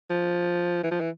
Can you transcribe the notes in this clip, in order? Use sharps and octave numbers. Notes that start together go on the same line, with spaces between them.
F3
E3
F3
E3